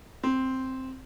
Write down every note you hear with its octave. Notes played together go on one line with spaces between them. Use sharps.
C4